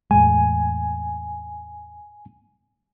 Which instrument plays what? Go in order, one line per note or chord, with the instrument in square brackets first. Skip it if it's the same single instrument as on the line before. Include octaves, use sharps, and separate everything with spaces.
[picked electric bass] E2 A2 G#3 [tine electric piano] G#5